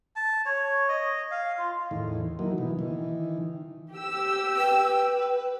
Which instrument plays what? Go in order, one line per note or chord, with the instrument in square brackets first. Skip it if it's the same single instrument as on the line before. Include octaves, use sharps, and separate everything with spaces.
[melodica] A5
C#5
D#5
F5
F4
[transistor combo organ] E2 A2 D#3
E3 F#3 A#3 D#4
B2 E3
D#3 E3
[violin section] G4 E6
[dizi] B4 [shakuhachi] G5